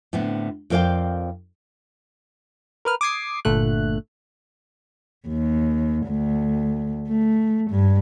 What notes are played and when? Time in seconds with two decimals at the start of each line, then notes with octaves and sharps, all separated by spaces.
0.13 A2 D3 B3 C4
0.70 F2 A#4 C5 D5 F5 G5
2.85 A#4 B4 F6
3.01 D6 D#6 G#6 C7
3.45 G1 A#2 D3 A3 F#6
5.28 D#2
6.07 D2
7.09 A3
7.70 G2